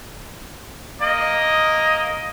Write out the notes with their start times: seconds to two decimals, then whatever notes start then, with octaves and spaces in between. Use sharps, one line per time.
1.01 A#3 D#5